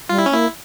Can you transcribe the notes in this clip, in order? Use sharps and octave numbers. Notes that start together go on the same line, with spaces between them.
G3 F4
E4
C#4
A#3 E4